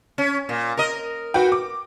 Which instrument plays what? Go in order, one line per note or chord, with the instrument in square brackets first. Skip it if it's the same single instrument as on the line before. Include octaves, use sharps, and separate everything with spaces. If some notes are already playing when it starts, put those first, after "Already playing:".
[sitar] C#4
A#2
A#4 D#5
[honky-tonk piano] F#4 B4 G5
D6